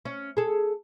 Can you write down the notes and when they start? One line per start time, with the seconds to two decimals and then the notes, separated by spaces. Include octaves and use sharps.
0.05 C#4
0.37 G#4 A4